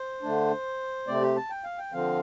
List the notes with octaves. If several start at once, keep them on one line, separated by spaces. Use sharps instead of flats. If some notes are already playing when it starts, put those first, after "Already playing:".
Already playing: C5
D3 A3 D4
C3 A3 C4 D5
G4
A5
G5
F5
G5
D3 F3 C4 F5